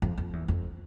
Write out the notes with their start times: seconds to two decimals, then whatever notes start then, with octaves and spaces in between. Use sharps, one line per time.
0.02 F2
0.18 F2
0.33 E2
0.48 F2